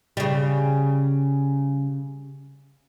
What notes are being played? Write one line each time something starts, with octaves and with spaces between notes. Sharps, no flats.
C#3 G3